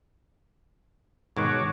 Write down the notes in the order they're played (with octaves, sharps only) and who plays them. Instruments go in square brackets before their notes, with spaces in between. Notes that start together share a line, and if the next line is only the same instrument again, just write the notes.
[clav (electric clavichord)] G#2 B2 D#3 [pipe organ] F#4 C#5 D6